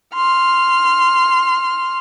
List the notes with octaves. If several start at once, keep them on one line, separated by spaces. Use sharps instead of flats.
C6 F6